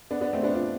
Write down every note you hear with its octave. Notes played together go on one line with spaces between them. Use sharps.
B3 D4
B3 D4
A3 C4
B3 D4
D4 F4